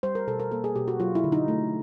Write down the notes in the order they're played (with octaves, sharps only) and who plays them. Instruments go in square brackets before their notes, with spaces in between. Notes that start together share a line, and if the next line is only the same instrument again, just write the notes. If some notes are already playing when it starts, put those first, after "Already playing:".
[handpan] G3 C5
A#4
B2 A4
A#4
A#3 A4
G#4
B2 G4
F#4
F#3 F4
E4
D3
D#4
A3